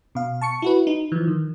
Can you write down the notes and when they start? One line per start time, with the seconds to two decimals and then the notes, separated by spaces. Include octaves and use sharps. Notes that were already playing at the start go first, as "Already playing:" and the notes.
0.15 B2 F5
0.41 A5 C#6 C#7
0.62 E4 F#4 B4
0.87 D#4
1.12 E3 F3
1.27 D#3